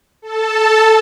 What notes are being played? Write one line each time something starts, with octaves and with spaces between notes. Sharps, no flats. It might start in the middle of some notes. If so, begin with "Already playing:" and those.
A4 A5